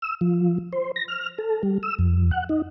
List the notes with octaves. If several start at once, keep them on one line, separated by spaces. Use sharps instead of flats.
E6
F3
C5
A#6
F6
A4
G3
E6
F2
F#5
D#4